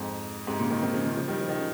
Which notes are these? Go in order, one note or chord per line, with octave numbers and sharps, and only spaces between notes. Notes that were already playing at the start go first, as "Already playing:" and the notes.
Already playing: F2 G#2
G#2 C3
A#2 C#3
C3 D#3
C3 D#3
C#3 F3
C3 D#3
C#3 F3
D#3 G3
F3
D#3
C#3